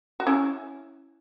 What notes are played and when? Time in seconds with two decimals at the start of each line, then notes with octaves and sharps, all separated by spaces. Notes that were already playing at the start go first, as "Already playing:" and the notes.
0.20 F#4
0.27 C#4 E4